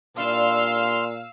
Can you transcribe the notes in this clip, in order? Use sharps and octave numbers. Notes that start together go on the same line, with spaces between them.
A#2 G3 D4 E4 F5 C6 E6 F6